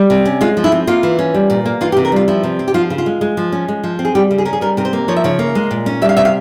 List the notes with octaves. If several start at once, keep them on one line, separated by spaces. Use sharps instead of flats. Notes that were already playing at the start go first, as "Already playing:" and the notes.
Already playing: G3
C3
C#4
G#3 F4
F3
E4
C4
A#3 F4
E3
C#4
G3
A#2
A#3
E3 F4
G4
C3
A#4
G3 F4
F3 E4
C3
C4
G4
F3 F4
C#3
F4
G#3
G#3
F3
C#4
G#3
F3
C4
G#4
G3 G4
C#3
G#4
C#4 A#4
G#4
G3 A#4
C3 A#4
C5
A#3
F3 C#5
E5
C#3 C#5
A#3
G#3
A#2
C#4
G3 E5
F5
C3 E5
F5